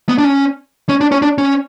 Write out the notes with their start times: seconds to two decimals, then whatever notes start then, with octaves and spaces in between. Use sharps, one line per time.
0.09 B3
0.18 D4
0.24 C#4
0.89 C#4
1.01 D4
1.12 C#4
1.22 D4
1.38 C#4